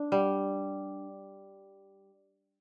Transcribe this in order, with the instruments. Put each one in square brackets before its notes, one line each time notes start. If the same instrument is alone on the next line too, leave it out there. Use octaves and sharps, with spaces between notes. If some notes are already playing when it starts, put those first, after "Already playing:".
Already playing: [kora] D4
G3